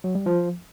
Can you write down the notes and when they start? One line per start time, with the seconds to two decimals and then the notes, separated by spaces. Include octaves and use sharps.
0.04 F#3
0.15 G3
0.26 F3